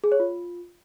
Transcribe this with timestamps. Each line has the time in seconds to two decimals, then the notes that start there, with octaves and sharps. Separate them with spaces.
0.04 G#4
0.12 C#5
0.20 F4